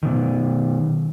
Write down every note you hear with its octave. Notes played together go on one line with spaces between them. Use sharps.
B2 D#3